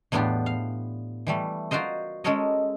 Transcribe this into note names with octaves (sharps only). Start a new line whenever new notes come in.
E2 A2 B3 D4 F4 G4
F5
E3 G3 A3
F4 F#4 A#4 C5 D#5
G#3 C#4 A4 A#4 C#5 D#5